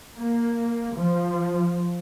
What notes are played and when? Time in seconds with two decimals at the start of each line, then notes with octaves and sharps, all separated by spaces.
0.15 A#3
0.96 F3